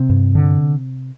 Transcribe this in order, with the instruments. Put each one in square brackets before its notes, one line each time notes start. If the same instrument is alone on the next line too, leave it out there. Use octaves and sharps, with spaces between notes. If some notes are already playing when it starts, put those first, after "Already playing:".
Already playing: [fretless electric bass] C3 C4
G2
D3